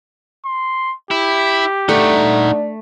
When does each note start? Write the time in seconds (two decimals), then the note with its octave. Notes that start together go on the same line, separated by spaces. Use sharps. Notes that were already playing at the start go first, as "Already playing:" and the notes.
0.45 C6
1.11 E4 G4
1.89 A3 D4 D#4 F#5